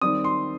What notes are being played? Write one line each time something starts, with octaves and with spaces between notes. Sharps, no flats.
D#3 G3 C4 D#6
C6